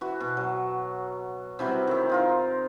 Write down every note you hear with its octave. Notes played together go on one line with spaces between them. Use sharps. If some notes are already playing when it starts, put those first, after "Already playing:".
E3 F#4
B2
F#3
C3 E3 F#3 G3
D#3 E4
D#4 F4 A#4